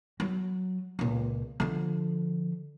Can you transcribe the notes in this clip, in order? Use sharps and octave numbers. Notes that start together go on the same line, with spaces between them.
F#3
C#2 A#2
D3 F3